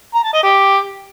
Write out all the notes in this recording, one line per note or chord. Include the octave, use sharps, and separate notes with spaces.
A#5
A5
D#5
G4